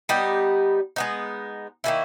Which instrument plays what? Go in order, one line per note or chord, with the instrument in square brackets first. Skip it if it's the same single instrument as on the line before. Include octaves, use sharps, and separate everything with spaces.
[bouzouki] G3 B3 D#4 G4
G#3 B3 D#4
D#3 A#3 C#4 E4